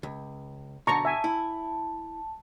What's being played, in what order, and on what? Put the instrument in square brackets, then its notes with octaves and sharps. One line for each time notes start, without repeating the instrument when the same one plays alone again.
[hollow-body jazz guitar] C#2
[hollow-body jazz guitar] B1 D3 [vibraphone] A5 [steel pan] A#5 C#6
[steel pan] E5 G#5
[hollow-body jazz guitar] E4